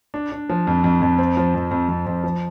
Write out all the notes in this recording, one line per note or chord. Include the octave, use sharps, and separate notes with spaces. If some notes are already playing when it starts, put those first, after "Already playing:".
D4
D4
F3
F2
F2
F2
C4
F3
F2
F2
F2
F2
F3